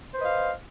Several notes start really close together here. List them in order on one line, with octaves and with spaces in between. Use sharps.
C5 B4 D#5 F5